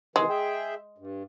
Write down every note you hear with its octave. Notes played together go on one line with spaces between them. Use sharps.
C3 D#3 E3 G#3
G#4 E5 G5
G2